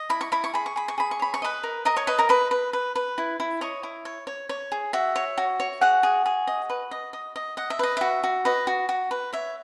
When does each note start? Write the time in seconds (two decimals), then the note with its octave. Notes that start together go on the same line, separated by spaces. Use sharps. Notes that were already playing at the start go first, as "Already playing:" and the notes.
Already playing: D#5
0.09 E4 B5
0.21 C#6
0.32 E4 B5
0.44 C#6
0.54 G#4 B5
0.66 C#6
0.76 G#4 B5
0.88 C#6
0.98 G#4 B5
1.11 C#6
1.19 C#5 B5
1.34 C#6
1.42 B4 D#5 B5
1.63 A#4
1.85 A#4 D#5 A#5
1.96 C#5 C#6
2.07 B4 D#5 B5
2.19 A#4 A#5
2.29 B4 D#5 B5
2.51 B4
2.73 B4
2.95 B4
3.18 E4
3.40 E4
3.61 C#5 D#5 C#6
3.83 E4
4.05 C#5
4.27 C#5
4.49 C#5
4.72 G#4
4.93 F#4 E5
5.16 C#5
5.38 F#4
5.60 C#5
5.81 F#4 G#4 F#5
6.03 G#4
6.26 G#4
6.47 D#5
6.70 B4
6.91 D#5
7.13 D#5
7.36 D#5
7.57 D#5 F#5
7.70 E5
7.79 B4 D#5
7.97 F#4 E5
8.23 F#4
8.45 B4 D#5
8.67 F#4
8.89 F#4
9.11 B4
9.33 C#5 E5